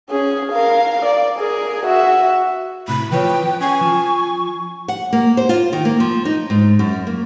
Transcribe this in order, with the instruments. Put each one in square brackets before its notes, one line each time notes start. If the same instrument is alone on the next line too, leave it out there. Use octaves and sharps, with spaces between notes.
[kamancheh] C#4 G#4
A#4 F5
D5
G#4 A#4
F#4 E5
[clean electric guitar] A2 C3 [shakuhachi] B5
[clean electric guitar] E3 F3 C#5 [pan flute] B4 [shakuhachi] G5
[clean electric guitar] C#4 [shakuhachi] G#5 [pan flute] C#6
[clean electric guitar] F3
[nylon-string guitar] F#5
A#3
C5
F4
D#3
A#3
F3
D#4
G#2
F#2
A#3